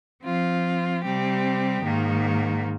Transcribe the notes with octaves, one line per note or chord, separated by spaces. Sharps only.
F3 C4 F4
C3 G3 C4 G4
G#2 D#3 A#3